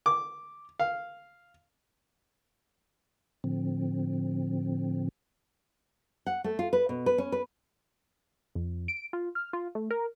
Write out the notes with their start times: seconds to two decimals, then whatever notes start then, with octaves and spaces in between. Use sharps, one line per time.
0.06 D6
0.80 F5
3.44 A2 D3 F3 C4
6.27 F#5
6.44 A3
6.59 F4
6.73 B4
6.89 B2
7.06 B4
7.18 C#4
7.32 B4
8.55 F2
8.88 D7
9.13 F4
9.35 F6
9.53 F4
9.75 A3
9.91 A#4